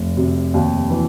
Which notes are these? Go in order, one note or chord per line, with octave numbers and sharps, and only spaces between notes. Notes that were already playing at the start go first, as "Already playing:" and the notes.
Already playing: F1
C3
D#2
E3